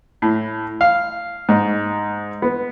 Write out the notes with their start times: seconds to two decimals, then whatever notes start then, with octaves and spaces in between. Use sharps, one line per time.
0.22 A2
0.81 F5
1.49 G#2
2.42 B3